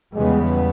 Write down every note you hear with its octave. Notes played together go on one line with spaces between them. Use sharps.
E2 C#3 G3 G#3 B3